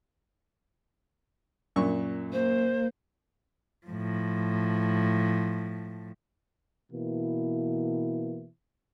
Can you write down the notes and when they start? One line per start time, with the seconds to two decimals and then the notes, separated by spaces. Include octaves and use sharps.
1.76 F#2 A#2 C#6
2.33 A#3 C5
3.87 A2 F3
6.92 B2 E3 A#3 E4